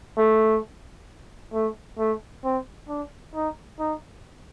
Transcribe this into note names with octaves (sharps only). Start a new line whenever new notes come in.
A3
A3
A3
C4
D4
D#4
D#4